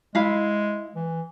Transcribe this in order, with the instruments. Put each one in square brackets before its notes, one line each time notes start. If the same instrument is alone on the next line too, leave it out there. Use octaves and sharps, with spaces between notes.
[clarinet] G#3 [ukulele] E4 F5 B5
[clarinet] E3